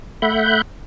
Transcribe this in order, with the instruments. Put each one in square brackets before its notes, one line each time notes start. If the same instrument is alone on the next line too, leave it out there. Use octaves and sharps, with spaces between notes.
[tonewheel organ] A3 E5 F#5 B5 F#6 G6